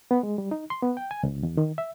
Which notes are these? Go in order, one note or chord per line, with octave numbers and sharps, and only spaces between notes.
B3
G#3
G3
D#4
C6
B3
G5
G#5
C#2
E2
D#3
E5